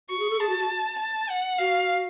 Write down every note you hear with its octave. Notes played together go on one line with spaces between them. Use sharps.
F#4 C#6
G#4
A4
G#4 A5
F#4
F#4
A5
F#5
F#4 F5